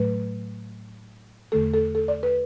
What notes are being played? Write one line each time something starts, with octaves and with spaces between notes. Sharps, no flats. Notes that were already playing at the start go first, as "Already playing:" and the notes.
Already playing: A2 F#3 A3 B4
E2 D3 A3 A4
A4
A4
D5
B4